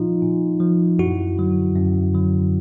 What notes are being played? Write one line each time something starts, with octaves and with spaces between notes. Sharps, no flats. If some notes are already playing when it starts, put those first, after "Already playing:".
Already playing: A#2 F3 D#4 F4
A#2
F3
F#2 E4 F#4
D3 F#3
F#2
D3 F#3